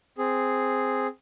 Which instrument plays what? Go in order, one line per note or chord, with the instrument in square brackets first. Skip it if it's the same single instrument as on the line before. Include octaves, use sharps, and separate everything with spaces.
[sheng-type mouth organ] C4 G#4